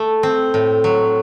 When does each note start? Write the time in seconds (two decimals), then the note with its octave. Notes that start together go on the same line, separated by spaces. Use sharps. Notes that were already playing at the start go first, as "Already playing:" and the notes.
Already playing: A3 A4
0.23 C4
0.54 A2
0.84 F#3